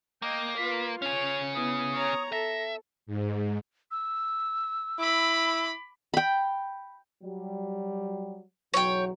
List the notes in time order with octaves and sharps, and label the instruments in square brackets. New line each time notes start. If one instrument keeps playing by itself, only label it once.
[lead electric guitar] A#3 [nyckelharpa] D#5 G5
[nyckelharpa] F4 B4 [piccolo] B6
[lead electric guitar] C#4 G#4 [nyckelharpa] C#5 [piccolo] F7
[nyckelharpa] B3 E4 [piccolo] D#6
[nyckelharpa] C#5 A#5
[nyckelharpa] A4 [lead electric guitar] E5 [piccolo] A#6
[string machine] G#2
[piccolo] E6
[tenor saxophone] E4 [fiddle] B5 D6
[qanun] G5 B5
[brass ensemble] F#3 G3
[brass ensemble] B1 E2 F#3 [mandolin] C#5 G5